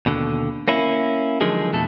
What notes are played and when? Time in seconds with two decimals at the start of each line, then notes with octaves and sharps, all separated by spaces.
0.06 D#2 B2 D3
0.68 A#3 C#4 E4
1.41 D3 D#3 F3 F#3 G#3 G#4
1.73 F2 B2 A3 A4